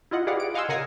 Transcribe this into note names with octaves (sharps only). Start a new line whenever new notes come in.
E4 F4 D#5 F#5
G4 G#4 B4 D5 F5 F#5
D7
D#5 F5 F#5 G#5 C6 E6
C#3 A#4 F#5 G#5 A#6 C7